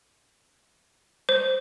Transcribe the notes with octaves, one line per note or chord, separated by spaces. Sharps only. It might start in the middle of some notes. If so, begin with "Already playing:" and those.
C5